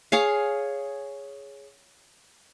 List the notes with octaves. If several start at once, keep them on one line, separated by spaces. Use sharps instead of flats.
G#4 C#5 F5